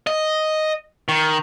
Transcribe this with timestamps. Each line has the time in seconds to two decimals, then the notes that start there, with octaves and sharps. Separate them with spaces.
0.07 D#5
1.09 D#3